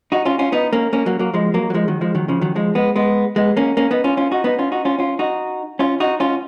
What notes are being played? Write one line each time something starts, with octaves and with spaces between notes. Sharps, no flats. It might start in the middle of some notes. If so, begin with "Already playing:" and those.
D#4 F#4
C#4 F4
C#4 F4
B3 D#4
A#3 C#4
A#3 C#4
F#3 A#3
F#3 A#3
F3 G#3
F#3 A#3
F#3
F3 G#3
D#3 F#3
F3 G#3
D#3 F#3
C#3 F3
D#3 F#3
F3 G#3
G#3 B3
G#3 B3
G#3 B3
A#3 C#4
A#3 C#4
B3 D#4
C#4 F4
C#4 F4
D#4 F#4
B3 D#4
C#4 F4
D#4 F#4
C#4 F4
C#4 F4
D#4 F#4
C#4 F4
D#4 F#4
C#4 F4